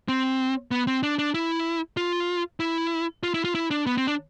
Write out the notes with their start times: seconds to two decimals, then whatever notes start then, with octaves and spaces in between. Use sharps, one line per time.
0.08 C4
0.71 B3
0.87 C4
1.03 D4
1.19 D4
1.34 E4
1.97 F4
2.60 E4
3.23 F4
3.34 E4
3.44 F4
3.55 E4
3.71 D4
3.86 B3
3.97 C4
4.07 D4